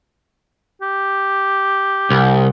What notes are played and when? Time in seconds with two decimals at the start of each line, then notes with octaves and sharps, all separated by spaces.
0.82 G4
2.10 C2